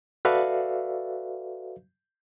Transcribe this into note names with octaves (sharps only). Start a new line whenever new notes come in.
F#4 A4 B4 D5 E5 F5